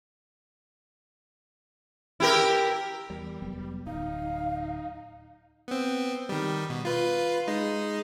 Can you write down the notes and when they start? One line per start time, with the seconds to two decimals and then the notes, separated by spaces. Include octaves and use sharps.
2.20 E4 G4 A#4
3.10 E2 G3
3.42 F1 F#3 B3
3.87 D1 D#4 F5
5.68 B3 C4
6.29 D#3 G3
6.70 B2
6.85 F4 B4
7.48 G#3 D#4